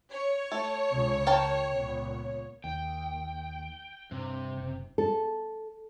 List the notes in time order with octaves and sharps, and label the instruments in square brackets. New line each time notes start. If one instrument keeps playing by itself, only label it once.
[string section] C#5
[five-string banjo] A3
[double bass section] C#2 C#3
[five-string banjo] A#4 G5 A5
[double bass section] C#2 A#2 B3
[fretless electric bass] D#2 [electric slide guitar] G5
[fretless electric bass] G2 [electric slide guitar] C3
[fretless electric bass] F#1
[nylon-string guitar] A4